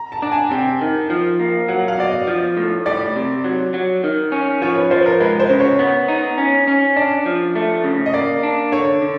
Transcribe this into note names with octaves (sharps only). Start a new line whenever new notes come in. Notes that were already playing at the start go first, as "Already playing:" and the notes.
Already playing: A#5
A5
D4
G#5
C3 G5
D#3
F3
A#3
F#3 F#5
F5
B2 D5
D#5
F3
A2
G3 D5
C3
F#3
F#3
D#3
C#4
F3 C#5
B4
F3 C5
A#4
G#3 B4
C5
C#3
C#5
B3 C#5
D#4
C#4
C#4
D4 D5
F3
A3
C#3
D#5
A#3 D5
D4
D3 C#5
D3